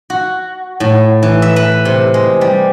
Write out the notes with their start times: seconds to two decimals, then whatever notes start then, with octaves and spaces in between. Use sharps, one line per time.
0.10 F#4
0.80 A2
1.23 E3
1.42 E5
1.56 B4
1.85 C3
2.14 G#3
2.41 G3